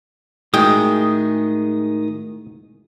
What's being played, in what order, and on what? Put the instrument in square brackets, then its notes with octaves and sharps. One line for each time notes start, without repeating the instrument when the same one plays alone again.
[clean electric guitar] A2 F#4 G#4 [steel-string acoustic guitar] D#3 [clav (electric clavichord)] G#3 G5 [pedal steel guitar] D#6